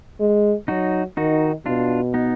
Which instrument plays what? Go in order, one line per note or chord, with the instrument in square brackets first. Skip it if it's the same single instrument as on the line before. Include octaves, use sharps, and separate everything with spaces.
[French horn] G#3
[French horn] F#3 [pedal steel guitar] D#4 F#4
[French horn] D#3 [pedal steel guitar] D#4 F#4
[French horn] B2 [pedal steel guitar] D4 F4
[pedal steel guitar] B3 D#4